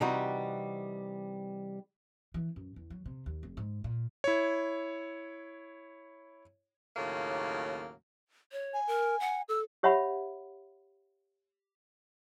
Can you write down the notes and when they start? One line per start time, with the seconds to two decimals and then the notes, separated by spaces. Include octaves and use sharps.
0.01 C3 E3 G3 D#4 F#4
2.34 E3
2.56 F#2
2.76 E2
2.90 F#3
3.06 C3
3.26 D#2
3.43 F1
3.57 G#2
3.84 A#2
4.24 E4 C#5
6.96 D#2 A2 C#3 F#3 A#3
8.52 C#5
8.74 G#5
8.87 A#4
9.20 F#5
9.49 A4 E6
9.83 G4 C#5 E5 F#5 B5